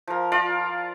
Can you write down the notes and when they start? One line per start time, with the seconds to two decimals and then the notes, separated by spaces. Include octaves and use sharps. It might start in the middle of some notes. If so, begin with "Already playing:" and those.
0.07 F3 A#4
0.32 F4 A#4 D5 F5